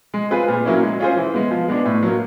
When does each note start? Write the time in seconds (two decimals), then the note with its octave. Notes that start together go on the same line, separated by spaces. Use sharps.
0.14 G#3
0.31 C4 F4 G#4 B4
0.48 A#2
0.65 F#3 A#3 C#4 E4
0.82 G#3
0.99 C#4 F4 G#4 C5
1.17 E3
1.34 G#3 B3
1.51 F3
1.68 G#3 B3 D4
1.85 A2
2.03 F#3 A#3